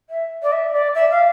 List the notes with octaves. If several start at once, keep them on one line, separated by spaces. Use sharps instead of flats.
E5
D5
E5
D5
E5
F5